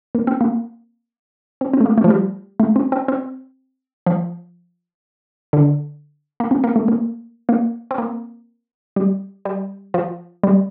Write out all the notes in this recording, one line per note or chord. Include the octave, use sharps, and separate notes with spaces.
A#3
C4
A#3
C4
C4
A3
A#3
A3
F3
G3
A3
C4
C4
C4
F3
D3
A#3
C4
A#3
A3
A#3
A#3
C4
A#3
G3
G3
F3
G3